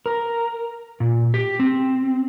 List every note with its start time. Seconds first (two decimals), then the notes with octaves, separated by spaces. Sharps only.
0.06 A#4
1.00 A#2
1.34 G4
1.60 C4